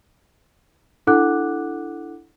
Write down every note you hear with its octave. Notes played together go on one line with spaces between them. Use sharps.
D4 E4 A4 F#5 D6 F#6